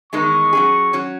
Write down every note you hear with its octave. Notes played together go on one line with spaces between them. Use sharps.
E2 D#3 G#3 D#4 C#6
F#3 C#4 G#4
F#3 C#4